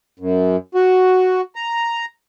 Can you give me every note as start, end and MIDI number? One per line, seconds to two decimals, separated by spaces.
0.19 0.56 42
0.75 1.41 66
1.56 2.05 82